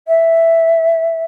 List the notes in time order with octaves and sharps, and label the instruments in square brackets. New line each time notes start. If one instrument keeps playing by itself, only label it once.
[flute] E5